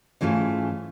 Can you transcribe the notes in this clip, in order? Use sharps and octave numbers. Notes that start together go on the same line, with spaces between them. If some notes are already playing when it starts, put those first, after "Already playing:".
G#2 E3 A3 C#4 F4